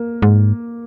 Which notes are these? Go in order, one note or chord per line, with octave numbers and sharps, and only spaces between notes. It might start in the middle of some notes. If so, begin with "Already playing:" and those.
Already playing: A#3
G#2